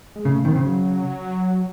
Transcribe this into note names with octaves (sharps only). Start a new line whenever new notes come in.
G#3
C#3 A3
A3
D#3 C4
C#3
F#3